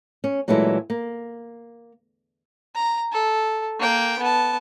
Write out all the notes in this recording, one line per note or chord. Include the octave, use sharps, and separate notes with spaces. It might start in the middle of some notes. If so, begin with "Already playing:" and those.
C#4
A#2 E3 F#3 G#3 A3 E4
A#3
A#5
A4
A#3 G5
B3 A5